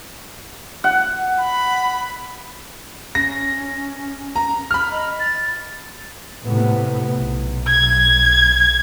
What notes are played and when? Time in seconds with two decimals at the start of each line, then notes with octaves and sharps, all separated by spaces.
0.84 F#5
1.40 B5
3.15 C#4 A#6
4.36 A#5
4.71 B5 F6
4.92 D#5
5.19 A6
6.46 A2 C3 B3
7.19 B1
7.67 G#6